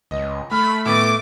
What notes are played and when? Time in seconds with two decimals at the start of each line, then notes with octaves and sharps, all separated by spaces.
0.11 C#2 D#5
0.51 A3 B5 F6
0.85 A2 B3 D6 A6